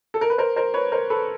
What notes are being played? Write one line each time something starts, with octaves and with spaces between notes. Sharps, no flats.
A4
A#4
B4
A#4 C5
A#4 C5
B4 C#5
A#4 C5
A4 B4